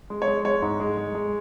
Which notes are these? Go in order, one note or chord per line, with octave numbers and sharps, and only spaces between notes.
G#3
C#5
G#3
G#3 C#5
G#2
G#3
G#3
G#3